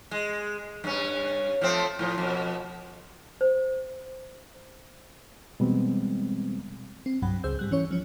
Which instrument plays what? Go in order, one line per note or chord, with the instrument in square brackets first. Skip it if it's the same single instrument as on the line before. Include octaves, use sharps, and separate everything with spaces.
[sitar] G#3
G2 C#4
F3 A3 C4
A2 F3
F2 B2
[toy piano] C5
[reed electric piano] B2 E3 G3 G#3 B3 C4
[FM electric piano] C4
C2 G2 F#3 F#5 B5
C#2 G#4 C5 E6 G6
G#2 G3 F#6
E3 C#4 C#5
F3 C#4